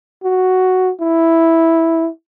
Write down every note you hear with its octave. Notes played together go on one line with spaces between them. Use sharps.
F#4
E4